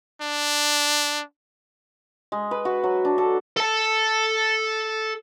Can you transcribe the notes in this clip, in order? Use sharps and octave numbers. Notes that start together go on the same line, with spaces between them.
D4
G#3
B4
F#4
F#3
D4
A4
A4 A5